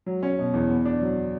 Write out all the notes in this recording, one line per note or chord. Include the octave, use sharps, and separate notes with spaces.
F#3
C#4
B2
E2
B3
D4
F#3